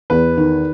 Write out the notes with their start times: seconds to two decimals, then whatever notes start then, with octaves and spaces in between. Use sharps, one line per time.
0.10 E2 B4
0.37 D#3